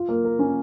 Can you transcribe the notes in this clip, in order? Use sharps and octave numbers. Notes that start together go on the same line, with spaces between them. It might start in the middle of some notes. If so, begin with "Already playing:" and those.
Already playing: F4
A#3
A#4
C#4